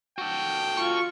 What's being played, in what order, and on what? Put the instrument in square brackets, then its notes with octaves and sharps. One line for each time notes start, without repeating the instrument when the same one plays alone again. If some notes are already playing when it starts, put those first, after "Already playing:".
[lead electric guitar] F#4 A4 [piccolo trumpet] G5
[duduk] F4 [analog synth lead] C#6